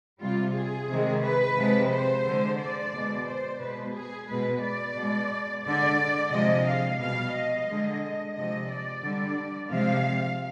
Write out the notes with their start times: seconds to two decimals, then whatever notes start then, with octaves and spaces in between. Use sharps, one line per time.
0.20 C3 G3 F4
0.55 G#4
0.89 C3 D#3 G#3
1.22 B4
1.57 C3 F3 G#3
1.90 C5
2.24 D3
2.29 G#3
2.59 D5
2.92 B2 G#3
3.26 C5
3.60 B2 G#3 B4
3.94 G#4
4.28 B2 G#3 B4
4.62 D5
4.96 B2 G#3
5.64 D3 G#3 D5
6.31 C3 F3 G#3 D#5
6.66 F5
6.99 B2 G3 F5
7.33 D#5
7.68 D3 G#3
8.35 C3 F3 G#3 D#5
8.70 D5
9.02 D3 G3
9.70 C3 F3 G#3 F5